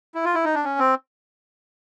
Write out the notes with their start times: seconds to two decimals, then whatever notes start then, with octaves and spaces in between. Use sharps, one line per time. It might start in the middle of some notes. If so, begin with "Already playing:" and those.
0.15 E4
0.25 F4
0.35 E4
0.45 D#4
0.55 D4
0.64 C#4
0.79 C4